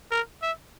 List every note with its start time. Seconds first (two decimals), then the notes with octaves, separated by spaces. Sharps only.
0.11 A#4
0.42 E5